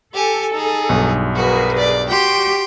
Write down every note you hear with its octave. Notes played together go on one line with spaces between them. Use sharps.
G4 A4 G#5
D#4 G#4
B1 G2
F#4 G#4 A#4 B4
D5
F#4 G4 G5 C6